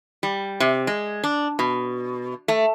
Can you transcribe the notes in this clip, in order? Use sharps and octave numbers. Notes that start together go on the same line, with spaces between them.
G3
C3
G#3
D4
B2
A3